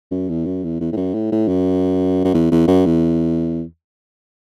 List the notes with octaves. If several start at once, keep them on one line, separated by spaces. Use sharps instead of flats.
F#2
E2
F#2
E2
E2
A2
F#2
A2
A2
F#2
F#2
E2
E2
F#2
E2